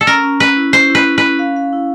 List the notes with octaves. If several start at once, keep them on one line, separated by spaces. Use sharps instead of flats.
A4
C#4 A#4
C#4
C#4 B4
E4
C#4 C5
E4 B4
C#4
B4
C#4
F5
F5
E4